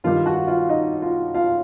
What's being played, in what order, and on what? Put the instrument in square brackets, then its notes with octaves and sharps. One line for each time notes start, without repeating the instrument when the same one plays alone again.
[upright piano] G2 D#3 G3 F4 F5
F#4 F#5
F4 F5
D#4 D#5
F4 F5
F4 F5